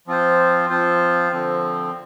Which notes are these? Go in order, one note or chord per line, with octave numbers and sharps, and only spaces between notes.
F3 C4 F4 C5
F3 C4 F4 C5
D3 F3 C4